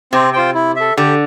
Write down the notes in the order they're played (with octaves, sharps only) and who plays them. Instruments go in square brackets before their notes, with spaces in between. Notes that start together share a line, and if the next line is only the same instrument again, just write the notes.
[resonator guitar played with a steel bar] C3 [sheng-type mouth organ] C4
[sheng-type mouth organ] F4 C5 G5
E4
A4 E5
[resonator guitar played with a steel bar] D3 [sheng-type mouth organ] G4